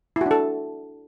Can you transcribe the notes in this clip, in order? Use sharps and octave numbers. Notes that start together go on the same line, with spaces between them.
D4 E4 F#4 A4